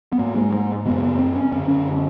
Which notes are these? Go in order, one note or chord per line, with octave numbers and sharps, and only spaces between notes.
B3
G#2 A#3
G#3
G#3
F#2 C#3 B3
B3
C4
C#4
F#2 D3 C#4
C#4